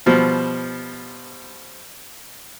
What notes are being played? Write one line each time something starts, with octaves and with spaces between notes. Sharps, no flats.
B2 F3 G3